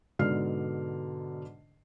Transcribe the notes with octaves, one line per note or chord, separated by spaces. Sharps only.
G#2 B2 D3 D5 F6 C7